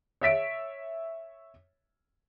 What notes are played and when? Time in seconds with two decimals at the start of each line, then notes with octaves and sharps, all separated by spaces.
0.21 C#5 E5 B6 D7